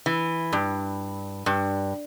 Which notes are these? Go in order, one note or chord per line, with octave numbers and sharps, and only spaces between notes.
E3
G2
G2